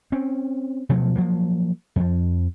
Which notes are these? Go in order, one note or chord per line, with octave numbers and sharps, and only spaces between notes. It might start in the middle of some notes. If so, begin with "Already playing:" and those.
C4 C#4
B2 F3 F#3 A3
F3 F#3 A#3
F2 F3